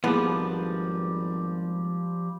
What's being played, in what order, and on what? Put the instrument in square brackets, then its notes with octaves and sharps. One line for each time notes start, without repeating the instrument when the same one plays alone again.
[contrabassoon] G#1 [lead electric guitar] F3 G3 [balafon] A#3 E4 G#4 [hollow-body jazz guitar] B3